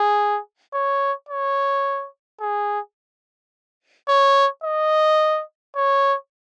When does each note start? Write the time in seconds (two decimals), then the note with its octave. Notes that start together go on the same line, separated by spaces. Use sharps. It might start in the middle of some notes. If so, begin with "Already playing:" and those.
Already playing: G#4
0.73 C#5
1.29 C#5
2.41 G#4
4.08 C#5
4.64 D#5
5.76 C#5